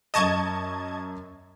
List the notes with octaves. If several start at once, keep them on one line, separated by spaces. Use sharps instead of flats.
F#2 D#5 A5 C#6 G#6 E7